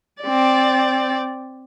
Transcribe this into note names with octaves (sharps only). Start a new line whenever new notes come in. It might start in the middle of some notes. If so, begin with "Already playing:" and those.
C4 D5